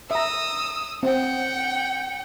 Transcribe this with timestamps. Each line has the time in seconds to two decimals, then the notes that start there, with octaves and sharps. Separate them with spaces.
0.11 E5 A#5 D#6 E6
1.03 C4 F#5 G5